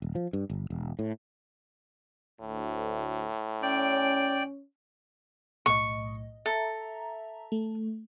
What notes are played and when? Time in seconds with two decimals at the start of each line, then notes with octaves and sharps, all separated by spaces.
0.02 D#1
0.15 F3
0.33 G2
0.50 G1
0.70 E1
0.99 A2
2.41 D2 A2
3.63 C#4 D5 G5
5.66 B1 A2 D#5 C#6
6.46 A4 E5 A#5
7.52 A3